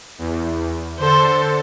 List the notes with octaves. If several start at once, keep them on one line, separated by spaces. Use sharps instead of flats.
E2
D3 A4 C5